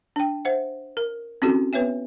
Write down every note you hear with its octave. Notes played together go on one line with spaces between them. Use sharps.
D4 G5
C5 E5 F#5
A#4
C4 C#4 E4 F#4 G4 A4
B3 B4 C#5 E5 G#5